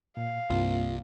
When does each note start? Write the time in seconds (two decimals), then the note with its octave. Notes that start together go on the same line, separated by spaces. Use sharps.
0.17 A#2 F5
0.50 C2 G2 A#3 C4 F4